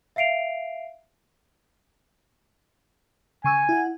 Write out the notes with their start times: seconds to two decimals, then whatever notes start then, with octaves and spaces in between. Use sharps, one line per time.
0.16 E5 F5 C7 D7 F7
3.44 C#3 G#5 C#6 E6
3.69 E4 F#5